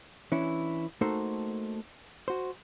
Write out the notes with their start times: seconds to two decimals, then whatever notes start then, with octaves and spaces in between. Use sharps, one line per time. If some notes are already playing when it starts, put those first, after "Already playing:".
0.32 E3 C#4 D4 E4
1.01 A3 A#3 D#4 F#4 A4 C5
2.28 F#4 C5